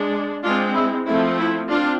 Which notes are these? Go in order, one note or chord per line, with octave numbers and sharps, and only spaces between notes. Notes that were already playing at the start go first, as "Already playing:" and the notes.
Already playing: G#3 D4
G#3 C4 D4 F4
E4
F3 A3 C4 E4
E4
C4 D4 F4